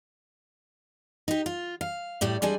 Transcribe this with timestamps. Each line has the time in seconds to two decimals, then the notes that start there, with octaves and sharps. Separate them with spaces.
1.28 D#4 G4
1.46 F4
1.81 F5
2.21 A2 G3 D5
2.42 G3 G#3 D4 G#5